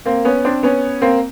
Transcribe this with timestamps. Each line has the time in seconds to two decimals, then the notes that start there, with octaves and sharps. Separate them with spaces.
0.06 A#3 C4
0.25 B3 C#4
0.45 C4 D4
0.63 B3 C#4
1.02 A#3 C4